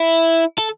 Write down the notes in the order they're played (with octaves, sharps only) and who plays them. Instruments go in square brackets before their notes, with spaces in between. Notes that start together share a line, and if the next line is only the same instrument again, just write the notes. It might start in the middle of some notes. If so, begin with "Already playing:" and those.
Already playing: [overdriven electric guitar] E4
A4